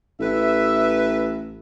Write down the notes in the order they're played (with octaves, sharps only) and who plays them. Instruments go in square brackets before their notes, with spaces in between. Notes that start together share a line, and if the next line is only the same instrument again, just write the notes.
[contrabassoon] A1 [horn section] B4 E5